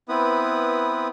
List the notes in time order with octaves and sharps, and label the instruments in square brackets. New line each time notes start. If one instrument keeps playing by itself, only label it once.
[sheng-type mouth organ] B3 C4 E4 B4 D#6